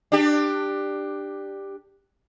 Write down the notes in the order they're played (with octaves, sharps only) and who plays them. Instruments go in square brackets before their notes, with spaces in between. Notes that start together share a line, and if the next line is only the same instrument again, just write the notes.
[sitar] D4 G4